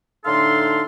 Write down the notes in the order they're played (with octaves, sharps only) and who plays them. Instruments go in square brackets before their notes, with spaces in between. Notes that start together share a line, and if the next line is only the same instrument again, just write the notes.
[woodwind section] A2 D3 D#4 A4 F5 C6